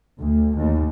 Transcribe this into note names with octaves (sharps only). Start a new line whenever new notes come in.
D2
D#2